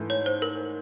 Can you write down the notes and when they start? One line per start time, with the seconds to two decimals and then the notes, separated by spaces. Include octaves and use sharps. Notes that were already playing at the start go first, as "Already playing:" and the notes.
Already playing: G#2 E3 A3
0.10 C#5
0.26 C5
0.42 A#4